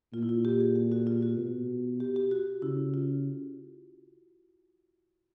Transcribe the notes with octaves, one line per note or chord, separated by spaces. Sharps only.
A#2 F4
E4
F4
G4
G#4
G4
F#4
F4
F#4
B2
G4
G4
F#4
C#3 E4
F4